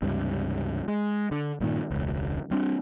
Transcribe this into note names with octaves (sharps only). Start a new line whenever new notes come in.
C#2 G2 C3
G#3
D3
G2 A#2 D#3
E1 C#2
G3 C4 D4